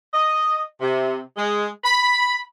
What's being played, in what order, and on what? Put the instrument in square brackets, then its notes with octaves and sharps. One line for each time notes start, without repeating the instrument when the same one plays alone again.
[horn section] D#5
C3
G#3
B5